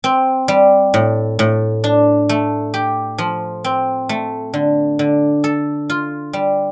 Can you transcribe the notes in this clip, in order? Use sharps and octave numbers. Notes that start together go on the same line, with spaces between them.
C4
G3
A2
A2
D4
A3
G4
F3
C4
A3
D3
D3
A4
F4
G3